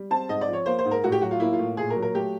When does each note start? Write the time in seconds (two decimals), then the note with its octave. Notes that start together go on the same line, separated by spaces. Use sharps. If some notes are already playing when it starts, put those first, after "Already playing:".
Already playing: G3
0.10 C4 A5
0.29 G#2 D#5
0.41 D5
0.48 F3
0.53 C#5
0.66 A#3 C5
0.79 C5
0.85 G#2
0.91 A#4
1.04 A2 F#4
1.12 G4
1.22 F#3 F#4
1.31 F4
1.40 A#3 E4
1.53 F4
1.59 A2
1.77 A#2 G#4
1.90 A#4
1.96 F#3
2.02 A#4
2.14 A3 G4